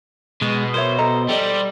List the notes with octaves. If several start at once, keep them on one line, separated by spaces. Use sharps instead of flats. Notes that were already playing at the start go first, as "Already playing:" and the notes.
B2 G#3
A#4 C5 C#5 E5
A4 D#5 A#5
G3 A4 D5 D#5